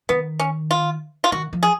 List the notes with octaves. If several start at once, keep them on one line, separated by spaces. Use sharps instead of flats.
D#3 B3
C#4
F4
F4
D#3 F#4
F3
G#4